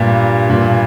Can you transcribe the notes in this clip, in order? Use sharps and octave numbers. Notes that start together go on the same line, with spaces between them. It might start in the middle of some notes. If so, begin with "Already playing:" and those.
Already playing: G2 A#2
G2 A#2